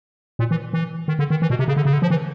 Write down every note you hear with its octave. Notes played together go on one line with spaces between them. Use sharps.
A#2
E3
E3
D#3
D3
D#3
E3
B2
C3
C#3
D3
C#3
D3
F3
E3